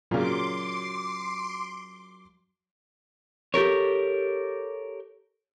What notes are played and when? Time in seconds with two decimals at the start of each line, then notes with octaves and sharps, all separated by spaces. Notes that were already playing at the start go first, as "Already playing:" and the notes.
0.11 A#2 C#3 F#3 C6 D6
3.54 G4 A4 A#4 C#5